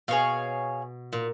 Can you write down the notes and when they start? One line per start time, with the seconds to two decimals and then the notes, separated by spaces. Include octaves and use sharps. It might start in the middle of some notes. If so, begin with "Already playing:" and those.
0.08 B2 G#4 C#5 F5
1.13 A#2